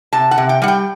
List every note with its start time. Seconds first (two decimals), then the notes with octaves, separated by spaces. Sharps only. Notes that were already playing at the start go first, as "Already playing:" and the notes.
0.13 C3 A5
0.31 F#5
0.38 C3
0.49 G5
0.62 G3 F#5
0.68 G5